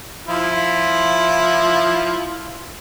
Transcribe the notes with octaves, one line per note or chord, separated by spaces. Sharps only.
F3 E4 F4